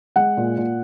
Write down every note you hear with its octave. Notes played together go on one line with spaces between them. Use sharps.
G#3 F#5
A#2
A#2